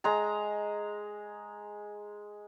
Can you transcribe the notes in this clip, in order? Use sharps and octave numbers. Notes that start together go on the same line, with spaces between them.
G#3 A#5